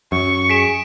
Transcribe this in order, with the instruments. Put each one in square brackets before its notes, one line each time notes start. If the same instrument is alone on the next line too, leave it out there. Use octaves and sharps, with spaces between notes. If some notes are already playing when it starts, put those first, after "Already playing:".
[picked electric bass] F#2 [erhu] C#6
[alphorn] G#4 [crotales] B6 D7 E7